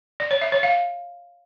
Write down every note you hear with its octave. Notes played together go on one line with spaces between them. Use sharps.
D5
C#5
E5
C#5
F5